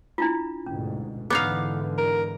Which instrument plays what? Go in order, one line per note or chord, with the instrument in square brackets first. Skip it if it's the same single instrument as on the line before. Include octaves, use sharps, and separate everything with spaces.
[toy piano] D4 E4 F4
[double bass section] D2 G#2 B2 [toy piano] C#4
[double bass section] G#2 D3 E3 [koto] B3 D#4 F5 [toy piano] D6
[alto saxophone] A#4